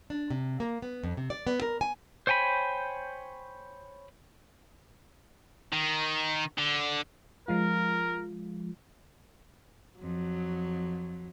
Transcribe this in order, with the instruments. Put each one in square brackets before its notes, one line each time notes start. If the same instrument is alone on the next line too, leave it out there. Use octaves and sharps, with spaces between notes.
[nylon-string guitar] D4
C3
A#3
B3
F2
C3
D5
B3
A#4
G#5
[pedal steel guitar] C5 C#5 G5 G#5 B5
[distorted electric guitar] D#3
D3
[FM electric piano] F3 G#3 F4 [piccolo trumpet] A#4
[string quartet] F2 F#3